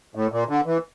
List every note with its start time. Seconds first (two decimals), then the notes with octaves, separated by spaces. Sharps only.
0.15 A2
0.32 A#2
0.49 D3
0.66 E3